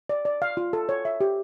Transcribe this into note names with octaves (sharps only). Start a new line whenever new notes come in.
D5
D5
F5
F4
A4
C#5
E5
G4